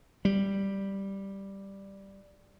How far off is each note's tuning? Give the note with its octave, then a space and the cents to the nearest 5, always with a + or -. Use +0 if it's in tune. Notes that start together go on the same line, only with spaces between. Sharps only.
G3 +0